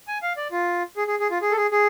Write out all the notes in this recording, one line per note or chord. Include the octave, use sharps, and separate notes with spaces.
G#5
F5
D5
F4
G#4
G#4
G#4
F4
G#4
A4
G#4
G#4